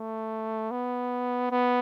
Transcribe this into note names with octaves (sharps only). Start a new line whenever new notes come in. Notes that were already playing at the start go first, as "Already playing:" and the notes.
Already playing: A3
B3
B3